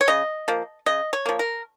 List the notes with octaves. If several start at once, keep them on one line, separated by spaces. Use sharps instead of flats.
C#5
C#3 D#5
F3 A#3
C#3 D#5
C#5
F3 A#3
A#4